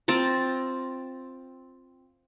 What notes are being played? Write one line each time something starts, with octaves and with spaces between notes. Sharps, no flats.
C4 F4 A5 A#5